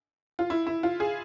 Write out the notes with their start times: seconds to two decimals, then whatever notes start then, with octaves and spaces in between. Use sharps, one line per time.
0.39 F4
0.50 E4
0.67 E4
0.83 F4
1.00 G#4